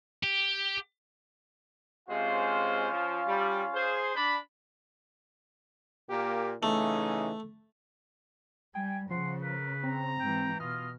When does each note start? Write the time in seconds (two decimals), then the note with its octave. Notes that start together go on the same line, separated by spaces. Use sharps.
0.23 G4
2.09 C3 G#3 C#4 F4 C5 F5
2.91 F3
3.27 G3
3.74 G#4 C5
4.15 D4 B5
6.10 A#2 A#3 G4
6.63 C#3 E3 A3 D#4
8.75 G3 G5 G#5
9.11 C#3 F3 F#5 C6
9.43 A#4 B4
9.83 C4 A#5
10.20 G#2 E3 G5
10.60 B2 F4 D#5 F6